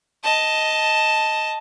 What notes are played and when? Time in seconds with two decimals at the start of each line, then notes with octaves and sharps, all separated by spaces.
0.23 D#5 A5